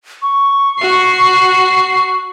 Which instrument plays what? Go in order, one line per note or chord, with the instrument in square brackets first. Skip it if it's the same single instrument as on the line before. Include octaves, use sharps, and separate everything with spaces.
[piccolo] C#6
[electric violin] F#4 C7